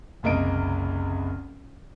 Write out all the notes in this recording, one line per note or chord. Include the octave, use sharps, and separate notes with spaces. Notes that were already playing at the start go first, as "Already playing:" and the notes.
F#1 C2 A#3 D#5 D7